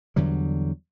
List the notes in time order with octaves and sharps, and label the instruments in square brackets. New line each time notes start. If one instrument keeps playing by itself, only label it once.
[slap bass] E2 D3 F#3 G3